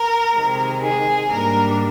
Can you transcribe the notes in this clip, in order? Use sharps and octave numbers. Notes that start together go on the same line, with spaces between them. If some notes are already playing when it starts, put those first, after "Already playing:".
Already playing: A#4
C3 D#3 G#3
G#4
G#2 G3 A#3 D4 A#4